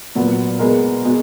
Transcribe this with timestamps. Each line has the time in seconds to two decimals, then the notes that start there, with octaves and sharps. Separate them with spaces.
0.15 A#2 F#3 B3
0.59 B2 G#3 B3 A#4
1.05 B2 G#3